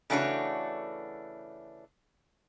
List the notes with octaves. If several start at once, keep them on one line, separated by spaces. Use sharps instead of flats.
C#3 E3 A3 D4 F#4 C#5